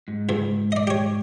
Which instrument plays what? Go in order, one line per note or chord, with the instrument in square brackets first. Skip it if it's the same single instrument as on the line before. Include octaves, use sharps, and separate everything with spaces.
[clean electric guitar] G#2
[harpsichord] C#2 G2
D5 D#5
G4 C#5